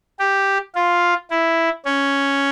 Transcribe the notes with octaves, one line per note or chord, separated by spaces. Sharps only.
G4
F4
E4
C#4